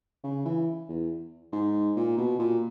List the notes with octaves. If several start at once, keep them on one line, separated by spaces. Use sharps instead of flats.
C#3
E3
E2
G#2
A#2
B2
A#2